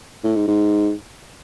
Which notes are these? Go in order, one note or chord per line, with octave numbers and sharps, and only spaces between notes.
A2
G#2
G#2